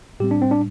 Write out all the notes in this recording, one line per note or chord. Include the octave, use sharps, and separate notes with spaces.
A2 G3 C4 G4
D4
C4
D4